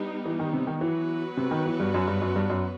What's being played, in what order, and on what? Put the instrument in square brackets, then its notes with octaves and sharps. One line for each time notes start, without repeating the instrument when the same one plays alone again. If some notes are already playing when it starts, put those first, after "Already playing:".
Already playing: [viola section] G3 B3 D#4
[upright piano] E3
D#3
C3
D#3
[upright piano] E3 [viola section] F#3 B3 F#4 B4
[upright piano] C3
D#3
E3
G2
F#2
G2
F#2
G2
F#2